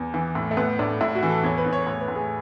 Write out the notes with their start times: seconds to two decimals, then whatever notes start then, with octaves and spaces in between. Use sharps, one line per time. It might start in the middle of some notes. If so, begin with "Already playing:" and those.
Already playing: E2 B3
0.14 E3
0.35 A2
0.51 A3
0.57 A2 B3
0.79 A2 D4
1.01 A2 E4
1.15 F#4
1.23 E3
1.29 A4
1.43 E2 C#5
1.58 B4
1.66 E2
1.73 C#5
1.87 A2 C#5
2.01 B4
2.08 A2
2.15 G#4